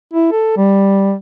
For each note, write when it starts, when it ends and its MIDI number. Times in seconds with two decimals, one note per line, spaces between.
0.14 0.30 64
0.32 0.55 69
0.57 1.14 55